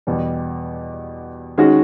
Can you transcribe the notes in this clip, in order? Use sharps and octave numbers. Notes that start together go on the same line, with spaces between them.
E2 B2 G3
D#3 G#3 C#4 F#4